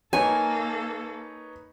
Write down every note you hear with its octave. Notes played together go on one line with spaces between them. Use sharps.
A#3 D#4 A4 B4 C#5 G#5